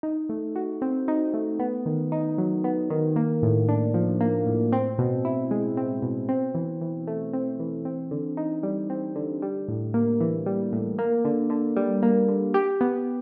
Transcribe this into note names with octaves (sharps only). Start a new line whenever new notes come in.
D#4
A3
F#4
C4
D#4
A3
B3
D#3
D#4
F#3
B3
D#3
A#3
A2
D4
F3
A#3
A2
C4
B2
E4
G#3
C4
B2
C4
E3
E3
A3
C4
E3
C4
D3
D#4
G3
C4
D3
G3
A2
A#3
E3
G3
A2
A#3
D3
D3
G3
A#3
D3
G4
B3